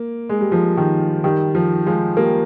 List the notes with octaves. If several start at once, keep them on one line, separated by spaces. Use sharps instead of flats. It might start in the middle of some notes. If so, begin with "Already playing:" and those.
Already playing: A#3
G#3
G3
F3 G#3
D#3 G3
D#3 G3
F3
F3 G#3
G3 A#3